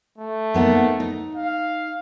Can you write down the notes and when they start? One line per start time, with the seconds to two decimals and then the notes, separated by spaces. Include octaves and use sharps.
0.18 A3
0.54 A#3 B3 D#4
1.00 D#4
1.35 F5